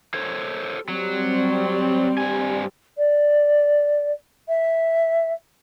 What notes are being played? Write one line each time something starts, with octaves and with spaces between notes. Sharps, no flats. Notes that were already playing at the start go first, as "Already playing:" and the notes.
A4 C5 C#5
F#3 G3 C4
G2 G#5
D5
E5